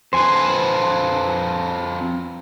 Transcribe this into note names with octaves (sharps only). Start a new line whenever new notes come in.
F2 B4 C5 G#5